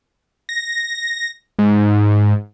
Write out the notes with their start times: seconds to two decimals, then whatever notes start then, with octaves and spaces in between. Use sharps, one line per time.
0.49 A#6
1.59 G#2